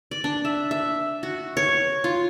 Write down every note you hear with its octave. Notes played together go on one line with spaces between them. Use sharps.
D5
D4
E5
E5
F#4
C#5
F4